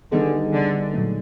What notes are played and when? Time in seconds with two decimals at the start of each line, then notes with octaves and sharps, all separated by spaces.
0.12 D3 D#3 G3 B3 D#4 G#4
0.53 D3
0.94 A#2 F#3 A3